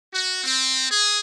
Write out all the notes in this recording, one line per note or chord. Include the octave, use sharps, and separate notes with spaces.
F#4
C4
G#4